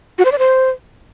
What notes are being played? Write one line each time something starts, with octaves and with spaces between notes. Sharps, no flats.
F#4
C5
D5
C5